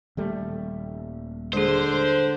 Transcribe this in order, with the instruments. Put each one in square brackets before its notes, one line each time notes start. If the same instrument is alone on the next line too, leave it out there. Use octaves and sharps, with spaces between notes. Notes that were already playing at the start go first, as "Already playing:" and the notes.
[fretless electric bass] D#1 G3 A3
[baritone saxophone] D3 [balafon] G#3 G#4 [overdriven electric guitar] C5